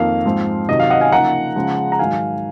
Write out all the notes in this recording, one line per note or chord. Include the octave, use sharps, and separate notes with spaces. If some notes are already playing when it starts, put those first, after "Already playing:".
Already playing: F2 D#3 A#3 F5
G#2 F3 C4
C3 D#3 F#3 D#5
F5
D#5 F#5
F5 G#5
C#3 F3 A#3 D#4 F#5 A#5
C#3 F3 G#3
A#5
G#2 D#3 F#3 F5 G#5